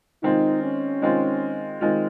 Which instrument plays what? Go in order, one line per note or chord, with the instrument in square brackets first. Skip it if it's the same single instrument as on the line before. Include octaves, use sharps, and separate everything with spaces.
[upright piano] D#3 G#3 C4 F4 [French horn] D#4
[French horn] C#4
[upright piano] D#3 G#3 C4 F4
D#3 G#3 C4 F4